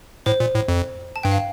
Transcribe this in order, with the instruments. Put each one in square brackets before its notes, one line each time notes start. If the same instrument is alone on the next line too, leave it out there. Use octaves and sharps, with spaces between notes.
[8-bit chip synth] A2 [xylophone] C5
[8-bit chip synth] A#2
A2
F2
[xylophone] A5
[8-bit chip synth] G2 [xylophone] G5
[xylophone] F5